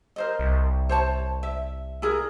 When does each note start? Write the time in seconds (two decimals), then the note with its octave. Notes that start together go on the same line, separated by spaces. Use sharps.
0.16 A#4 C5 D#5
0.40 C2
0.89 C5 C#5 A5
1.43 E5
2.02 E4 G#4 A#4